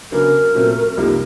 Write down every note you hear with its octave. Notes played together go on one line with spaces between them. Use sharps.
C#3 F#3 B3 D4 A#4
A#2 F#3 A3 C4
C2 C3 F3 A#3 D#4